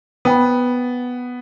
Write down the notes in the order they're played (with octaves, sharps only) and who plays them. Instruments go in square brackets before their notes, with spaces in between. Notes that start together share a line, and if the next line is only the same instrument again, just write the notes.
[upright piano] B3 [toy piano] C5 G5 B5